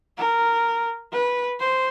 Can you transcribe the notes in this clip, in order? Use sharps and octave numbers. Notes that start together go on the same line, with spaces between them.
A#4
B4
C5